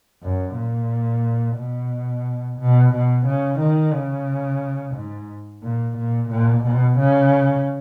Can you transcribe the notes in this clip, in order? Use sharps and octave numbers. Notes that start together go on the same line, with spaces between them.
F#2
A#2
B2
B2
B2
C#3
D#3
C#3
G#2
A#2
A#2
A#2
B2
C#3